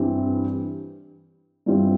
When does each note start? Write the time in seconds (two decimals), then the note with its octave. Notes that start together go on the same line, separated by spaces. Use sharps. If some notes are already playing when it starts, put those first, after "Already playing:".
Already playing: G2 E3 G3 C4
1.66 G2 E3 G3 C4 F4